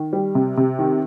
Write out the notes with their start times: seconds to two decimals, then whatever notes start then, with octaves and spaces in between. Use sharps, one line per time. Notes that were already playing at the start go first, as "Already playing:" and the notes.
Already playing: D#3
0.13 G3
0.35 C3
0.57 C3
0.79 D#3